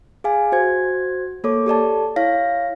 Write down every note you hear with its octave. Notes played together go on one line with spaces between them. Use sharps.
G#4 F5 G#5
F#4 C5 G#6
A#3 A4 C#5 D6
G4 A4 D5 A5
E4 C#5 F5 A#6